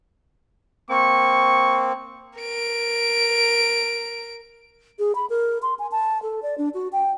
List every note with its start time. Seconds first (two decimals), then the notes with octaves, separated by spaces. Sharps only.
0.89 A#3 C4 C#6
2.40 A#4 D7
4.99 G#4
5.15 B5
5.30 A#4
5.62 C6
5.79 G#5
5.91 A5
6.23 A4
6.42 D5
6.58 D4
6.74 F#4
6.92 G5